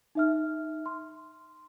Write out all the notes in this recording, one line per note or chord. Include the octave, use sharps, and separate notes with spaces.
D#4 E5 F6
C6